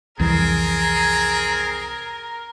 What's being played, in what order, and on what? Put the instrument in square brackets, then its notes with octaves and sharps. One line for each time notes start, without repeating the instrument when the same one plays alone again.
[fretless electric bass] C2 F2 E3 [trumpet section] C4 G#4 [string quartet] A#4